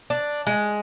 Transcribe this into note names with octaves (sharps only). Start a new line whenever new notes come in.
D4
G#3